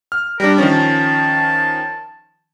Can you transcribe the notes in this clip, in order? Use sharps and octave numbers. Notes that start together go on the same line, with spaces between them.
F6
G3 D4 A#4
D#3 F3 C#4 A5